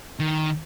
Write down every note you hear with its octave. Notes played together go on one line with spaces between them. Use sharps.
D#3